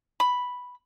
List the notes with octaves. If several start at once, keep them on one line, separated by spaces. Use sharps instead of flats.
B5